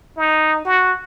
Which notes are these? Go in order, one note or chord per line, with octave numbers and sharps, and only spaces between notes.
D#4
F#4